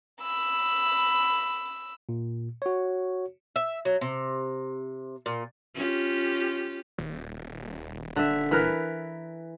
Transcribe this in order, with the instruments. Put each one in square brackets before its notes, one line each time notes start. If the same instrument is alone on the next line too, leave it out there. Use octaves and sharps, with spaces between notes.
[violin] B5 E6
[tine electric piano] A#2
F#4 C#5
[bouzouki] E5
F#3
C3
A#2
[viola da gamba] C#4 F4 G4
[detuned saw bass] D#1
[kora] D3 E5
E3 A#4 B4